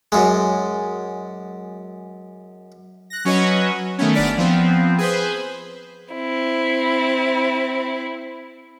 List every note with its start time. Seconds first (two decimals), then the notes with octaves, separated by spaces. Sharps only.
0.12 F#2 G#3
3.10 F#6 A#6
3.25 F#3 C#4 F#4 B4 C#5 D#5
3.98 D#3 A3 B3 C#4
4.14 G#1 B3 D4 D5 F6 B6
4.37 F3 B3 C4
4.98 G#4 B4 C5
6.13 C4 E4